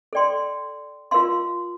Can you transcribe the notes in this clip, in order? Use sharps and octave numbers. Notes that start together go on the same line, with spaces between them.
A4 D5 G5 C6
F4 A#4 F5 C6